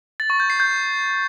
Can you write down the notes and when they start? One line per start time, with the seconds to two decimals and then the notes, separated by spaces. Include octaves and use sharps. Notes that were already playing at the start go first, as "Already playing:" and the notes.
0.20 A6
0.30 C#6
0.40 G6
0.50 C7
0.60 G6